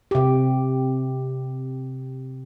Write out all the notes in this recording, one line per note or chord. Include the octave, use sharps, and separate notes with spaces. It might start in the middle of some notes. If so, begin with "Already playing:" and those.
C3 G4